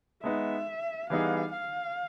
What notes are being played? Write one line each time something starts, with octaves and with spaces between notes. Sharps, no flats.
G#3 B3 D#4 E5
E3 G3 B3 D#4 G#4 F5
F5